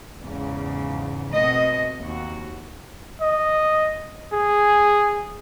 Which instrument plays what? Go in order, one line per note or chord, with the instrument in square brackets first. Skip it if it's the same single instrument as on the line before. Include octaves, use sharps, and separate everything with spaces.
[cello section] E2 G#2 C#3
B2 A3 B3 C4 D#5
D#2 F#4
[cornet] D#5
G#4